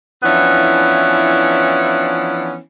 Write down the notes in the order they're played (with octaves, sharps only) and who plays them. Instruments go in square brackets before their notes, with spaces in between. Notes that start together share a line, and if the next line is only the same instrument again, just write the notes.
[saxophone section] E3 F3 B3 C#4 D4 E4